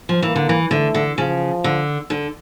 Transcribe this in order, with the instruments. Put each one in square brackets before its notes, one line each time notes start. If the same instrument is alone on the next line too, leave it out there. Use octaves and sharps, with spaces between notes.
[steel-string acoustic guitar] F3
[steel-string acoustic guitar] E3 [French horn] A#3
[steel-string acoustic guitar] D3
E3
[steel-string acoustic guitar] D3 [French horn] A3
[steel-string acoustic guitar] D3
[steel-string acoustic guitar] C#3 [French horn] F3
[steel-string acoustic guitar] D3
D3